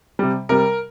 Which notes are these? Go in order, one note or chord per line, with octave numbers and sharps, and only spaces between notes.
C3 G3
C3 G3 A#4